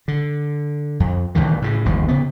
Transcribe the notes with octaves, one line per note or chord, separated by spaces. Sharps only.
D3
F2
A#1 D#2 D#3 E3
A2 C#3
G1 D#2 F3
C#3 B3